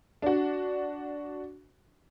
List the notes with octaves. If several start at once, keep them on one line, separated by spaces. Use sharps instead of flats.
D4 F#4